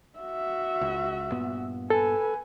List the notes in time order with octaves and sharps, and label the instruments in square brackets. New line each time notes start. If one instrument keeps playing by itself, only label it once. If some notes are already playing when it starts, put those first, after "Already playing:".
[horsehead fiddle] F#4 E5
[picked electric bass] C#2
G2 A#2 B3
[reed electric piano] A4 [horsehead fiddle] B4 G#5